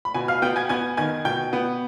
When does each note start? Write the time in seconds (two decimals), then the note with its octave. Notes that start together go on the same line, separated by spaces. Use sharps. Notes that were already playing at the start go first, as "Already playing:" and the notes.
0.05 B5
0.14 B2 G#5
0.28 F5 F6
0.42 B3 G5 G6
0.56 G#5 G#6
0.69 B3 G#5 G#6
0.97 D#3 G#5 G#6
1.25 B2 G5 G6
1.53 B3